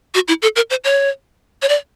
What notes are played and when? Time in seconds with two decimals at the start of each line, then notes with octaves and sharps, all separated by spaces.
0.15 F#4
0.28 E4
0.42 A4
0.56 A#4
0.70 C5
0.84 C#5
1.62 C#5
1.69 D5